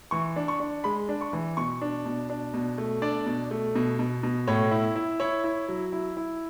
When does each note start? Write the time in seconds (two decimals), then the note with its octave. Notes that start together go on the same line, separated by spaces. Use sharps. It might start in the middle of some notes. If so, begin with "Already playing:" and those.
0.11 E3 C#6
0.36 D4
0.48 C#6
0.60 D4
0.84 G#3 B5
1.09 D4
1.21 C#6
1.33 E3
1.57 B2 C#6
1.81 D4
2.05 B2
2.30 D4
2.54 B2
2.78 A3
3.02 D4 D5
3.27 B2
3.51 A3
3.75 B2
3.99 B2
4.23 B2
4.48 A2 C#5
4.71 E4
4.96 E4
5.20 E4 C#5
5.44 E4
5.68 F#3
5.92 E4
6.17 E4